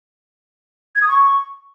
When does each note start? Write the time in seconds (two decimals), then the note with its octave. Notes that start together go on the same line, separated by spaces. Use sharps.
0.95 G#6
1.01 D#6
1.08 C#6